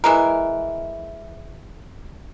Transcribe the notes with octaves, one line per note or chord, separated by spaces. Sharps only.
E3 G#3 A#4